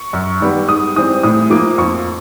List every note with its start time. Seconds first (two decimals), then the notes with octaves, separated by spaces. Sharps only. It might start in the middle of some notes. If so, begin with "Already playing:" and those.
Already playing: C#6
0.13 F#2
0.40 D#3 G3 B3
0.68 G#2 D#6
0.96 E3 G3 C4 D#6
1.23 A2 D#6
1.50 F3 A#3 D6
1.78 F2 C#6